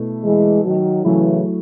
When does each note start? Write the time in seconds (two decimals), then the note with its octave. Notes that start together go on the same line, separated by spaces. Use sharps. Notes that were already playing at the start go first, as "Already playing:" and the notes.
Already playing: B2 A3 E4
0.22 E3 G#3
0.64 D#3 F#3
1.05 C#3 E3 F#3 A3 E4